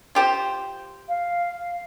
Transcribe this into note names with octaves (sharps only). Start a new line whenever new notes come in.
F4 G4 C5
F5